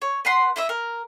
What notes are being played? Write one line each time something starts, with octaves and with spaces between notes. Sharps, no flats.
C#5
B4 F#5 C6
E4 D#5 E5
A#4